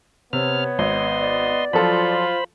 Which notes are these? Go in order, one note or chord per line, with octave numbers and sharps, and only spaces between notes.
C3 B3 C#5 F6
G#1 D#5 C6
D5
F3 F#3 F4 A4 C5 B5